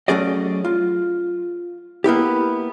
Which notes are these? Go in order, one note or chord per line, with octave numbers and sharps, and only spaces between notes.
F#3 A3 C#4 G#4 D5 D#5
F4
A#3 B3 E4 G4